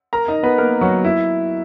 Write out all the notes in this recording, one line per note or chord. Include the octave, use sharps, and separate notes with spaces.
A#4 A#5
D#4 D#5
B3 B4
A#3 A#4
F#3 F#4
E4